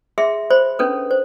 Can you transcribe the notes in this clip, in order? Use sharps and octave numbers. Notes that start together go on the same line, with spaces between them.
G#4 E5 C6
C5 B5
C#4 D4 A4 B4
C5